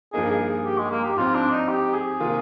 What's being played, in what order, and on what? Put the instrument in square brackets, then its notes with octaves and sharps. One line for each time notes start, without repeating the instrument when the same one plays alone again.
[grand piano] G2 F3 A#3 D#4 [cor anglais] G#4
[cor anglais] G#4
G4
G#3
A#3
G4
[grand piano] G#2 F3 G#3 C4 [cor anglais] F4
[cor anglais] D4
D#4
G4
G#4
[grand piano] C3 D#3 A#3 F4